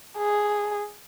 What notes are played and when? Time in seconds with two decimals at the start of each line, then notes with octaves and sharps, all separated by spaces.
0.17 G#4